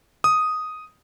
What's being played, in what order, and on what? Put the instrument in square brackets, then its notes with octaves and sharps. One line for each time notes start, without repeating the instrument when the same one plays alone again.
[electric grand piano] D#6